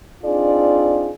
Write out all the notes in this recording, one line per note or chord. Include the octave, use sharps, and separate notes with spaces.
C4 D4 D#4 F4 G#4 D5